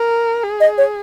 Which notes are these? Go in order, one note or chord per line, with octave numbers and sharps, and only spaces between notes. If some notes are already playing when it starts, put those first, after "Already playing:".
Already playing: A#4
G#4
D#5
C#5